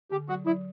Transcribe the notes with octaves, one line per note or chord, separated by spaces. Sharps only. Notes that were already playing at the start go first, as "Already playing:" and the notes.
D3 G4
F#3 F#4
F#3 E4